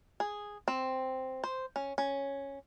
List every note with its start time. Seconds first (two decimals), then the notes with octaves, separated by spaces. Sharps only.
0.20 G#4
0.68 C4
1.44 C5
1.76 C#4
1.98 C#4